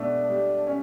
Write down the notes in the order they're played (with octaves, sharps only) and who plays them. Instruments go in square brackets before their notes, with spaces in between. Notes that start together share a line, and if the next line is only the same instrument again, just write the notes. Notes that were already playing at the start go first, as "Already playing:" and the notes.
Already playing: [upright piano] B2 A3 [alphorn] D4
[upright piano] G3
C#4